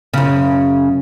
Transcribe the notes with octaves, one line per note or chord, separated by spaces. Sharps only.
F#2 C#3